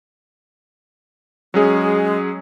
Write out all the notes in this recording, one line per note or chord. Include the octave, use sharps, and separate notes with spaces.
F#3 G#3 C#4 G#4